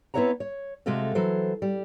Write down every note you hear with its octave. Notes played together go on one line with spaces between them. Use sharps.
B3 C4 E4 C#5 F#5 A#5
C#5
C3 G#3 A3 F#4 A4 F5
E3 F#3 A4 C5
G3